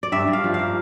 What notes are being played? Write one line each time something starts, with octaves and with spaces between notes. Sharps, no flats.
D5
G2 E5
G2
F5
F3
A#3 F5